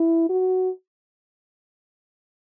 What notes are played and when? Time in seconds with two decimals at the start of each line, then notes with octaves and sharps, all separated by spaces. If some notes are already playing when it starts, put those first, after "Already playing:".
Already playing: E4
0.29 F#4